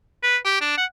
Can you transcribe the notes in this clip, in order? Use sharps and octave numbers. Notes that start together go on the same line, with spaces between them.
B4
G4
D4
F#5